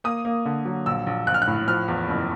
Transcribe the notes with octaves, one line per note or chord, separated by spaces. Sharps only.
A#3 D#6
A#3
D3
F#3
A#1 E6
A#1
A#1 F#6
F6
F#6
A2
F3 F6
E2
F#1